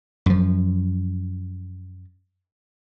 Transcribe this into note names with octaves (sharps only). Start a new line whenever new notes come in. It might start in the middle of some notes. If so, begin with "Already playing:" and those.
F#2 F3